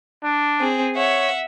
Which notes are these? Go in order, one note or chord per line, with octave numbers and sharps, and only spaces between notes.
D4
C4 G#4
C#5 E5 F#5